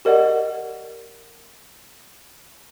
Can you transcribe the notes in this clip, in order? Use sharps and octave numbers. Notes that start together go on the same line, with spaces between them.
G4 A#4 D5 D#5 F#5